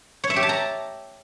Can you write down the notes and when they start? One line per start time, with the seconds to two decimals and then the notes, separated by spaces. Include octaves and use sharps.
0.24 C#5
0.30 E5
0.36 G4
0.43 A5
0.49 A#5